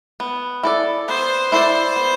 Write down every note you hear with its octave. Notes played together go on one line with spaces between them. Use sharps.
B3
E4 A4 D5
B3 C5
E4 A4 C5 D5
B3